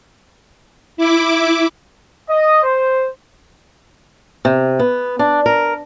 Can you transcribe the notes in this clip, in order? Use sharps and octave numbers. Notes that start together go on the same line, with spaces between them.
E4 D6
D#5
C5
C3
B3
D4
A#4